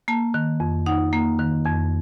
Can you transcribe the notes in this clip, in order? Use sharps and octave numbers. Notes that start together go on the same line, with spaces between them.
A#3 A5
D#3
F2
D#4 F#5
A#3
D#3
F2